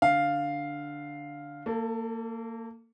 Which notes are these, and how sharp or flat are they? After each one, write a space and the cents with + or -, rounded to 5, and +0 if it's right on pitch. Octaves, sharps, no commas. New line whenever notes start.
D3 +0 F5 +0
A#3 -25 A4 +20